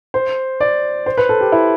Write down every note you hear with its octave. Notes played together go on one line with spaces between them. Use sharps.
C5
D5
C5
B4
A4
G4
E4